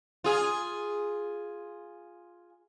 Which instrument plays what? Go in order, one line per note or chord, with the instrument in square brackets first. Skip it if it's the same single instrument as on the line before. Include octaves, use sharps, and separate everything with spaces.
[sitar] F4 G#4